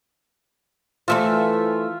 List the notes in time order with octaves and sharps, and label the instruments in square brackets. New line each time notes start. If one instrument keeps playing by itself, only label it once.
[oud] E3 A3 C5 [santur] F4 E5